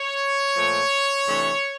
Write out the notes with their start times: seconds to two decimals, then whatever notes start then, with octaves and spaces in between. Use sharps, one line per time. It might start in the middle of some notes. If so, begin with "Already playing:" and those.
Already playing: C#5
0.55 A#2 F3 A3
1.26 C3 E3 A3 D4